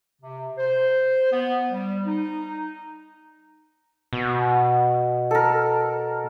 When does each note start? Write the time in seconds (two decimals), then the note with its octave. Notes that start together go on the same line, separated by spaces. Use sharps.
0.21 C3
0.58 C5
1.32 B3
1.71 G3
2.06 D#4
4.13 B2
5.31 A4 A#4